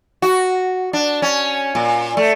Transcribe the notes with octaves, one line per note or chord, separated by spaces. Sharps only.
F#4
D4
C#4
A#2
A3